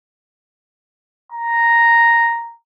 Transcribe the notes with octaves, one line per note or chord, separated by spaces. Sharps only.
A#5